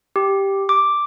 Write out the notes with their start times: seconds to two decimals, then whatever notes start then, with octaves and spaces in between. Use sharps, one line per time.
0.16 G4
0.69 D6